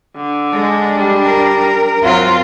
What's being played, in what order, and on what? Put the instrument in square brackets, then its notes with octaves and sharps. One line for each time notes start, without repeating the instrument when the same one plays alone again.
[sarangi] D3
[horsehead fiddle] G#3 A4 [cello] D4
[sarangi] G3
[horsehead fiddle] A#4
[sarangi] F#3 [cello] C4 F4